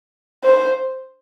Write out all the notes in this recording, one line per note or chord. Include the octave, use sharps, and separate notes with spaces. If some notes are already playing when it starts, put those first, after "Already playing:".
C5